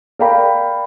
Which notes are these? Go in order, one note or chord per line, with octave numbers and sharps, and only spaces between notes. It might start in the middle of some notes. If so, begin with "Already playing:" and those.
A#4 D5 F5 G5 A#5 B5